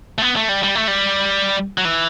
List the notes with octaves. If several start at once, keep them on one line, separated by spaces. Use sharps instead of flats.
A3
B3
A3
G3
G3
A3
G3
F#3
E3